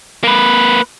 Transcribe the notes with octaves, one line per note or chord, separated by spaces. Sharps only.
A#3 B4